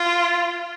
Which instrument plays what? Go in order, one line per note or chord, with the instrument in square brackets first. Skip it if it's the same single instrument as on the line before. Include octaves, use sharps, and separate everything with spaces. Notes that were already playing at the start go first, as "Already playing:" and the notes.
Already playing: [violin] F4